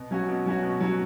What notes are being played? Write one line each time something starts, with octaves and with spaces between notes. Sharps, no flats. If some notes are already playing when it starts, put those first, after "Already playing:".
Already playing: B2
F#3 C#4 F#4
B2
F#3 C#4 F#4
B2
F#3 C#4 F#4